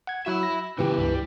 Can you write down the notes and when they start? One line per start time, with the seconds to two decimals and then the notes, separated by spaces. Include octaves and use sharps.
0.07 F#5 G#6
0.26 F#3 E4 F#4 E5 B5
0.43 A#6
0.78 C#3 E3 B3 G4
0.98 C#2 G2 G3